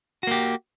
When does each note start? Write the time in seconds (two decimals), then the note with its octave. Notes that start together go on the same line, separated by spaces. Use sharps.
0.23 F#4
0.27 A#3
0.31 G4